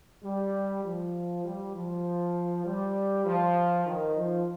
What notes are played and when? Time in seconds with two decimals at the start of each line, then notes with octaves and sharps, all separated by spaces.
0.24 G3
0.84 F3
1.45 G3
1.75 F3
2.65 G3
3.26 F3
3.87 D#3
4.17 F3